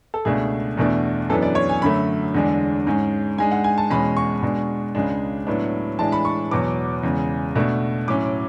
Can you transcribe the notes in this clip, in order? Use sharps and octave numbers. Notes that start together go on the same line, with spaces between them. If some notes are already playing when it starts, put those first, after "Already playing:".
A4
C#2 B2 A3 D4 G#4
E2 B2 A3 D4
F#2 E3 B3 D4 A4
D5
C#5
G#5
F#2 D3 F#3 A3 B5
E2 D3 G#3 D4
G#2 G#3 C#4
G#2 G#3 D4 G#5
F#5
G#5
A5
E2 B2 G#3 C#4 B5
C#6
B2 G#3 D4
C#2 C#3 G#3 D4
A2 F#3 B3 D4
A2 E3 G#3 D4 A5
B5
C#6
E2 B2 F#3 B3 D6
E2 C#3 G#3
B2 A3 D4
A2 F#3 C#4 D6